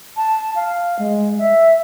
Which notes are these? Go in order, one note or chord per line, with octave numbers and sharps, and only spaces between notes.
A5
F5
G#3
E5